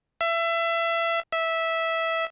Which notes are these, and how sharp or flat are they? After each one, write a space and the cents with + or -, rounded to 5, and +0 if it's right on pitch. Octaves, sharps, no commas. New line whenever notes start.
E5 +25
E5 -10